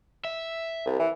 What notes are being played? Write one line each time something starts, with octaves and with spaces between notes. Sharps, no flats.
E5
C2
E3